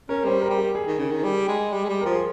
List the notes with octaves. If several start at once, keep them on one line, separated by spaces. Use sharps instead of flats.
C#4 A#4
G3 C5
A#4
G3
G4
G#4
D#3
C#3
D#3
G3
G#3
G3
G#3
G3
F3 A#4
G#4